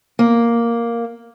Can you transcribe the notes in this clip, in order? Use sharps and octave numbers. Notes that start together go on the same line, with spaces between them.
A#3